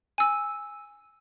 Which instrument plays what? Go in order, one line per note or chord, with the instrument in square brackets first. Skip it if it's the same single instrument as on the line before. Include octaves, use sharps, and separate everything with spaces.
[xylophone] G#5 E6